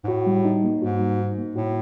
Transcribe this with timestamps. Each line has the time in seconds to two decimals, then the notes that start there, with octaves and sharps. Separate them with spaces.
0.04 G#2
0.08 A2 F#4
0.27 G3
0.45 D#4
0.64 A#3
0.82 G#2 F#4
1.00 G3
1.19 D#4
1.38 A#3
1.55 A2 F#4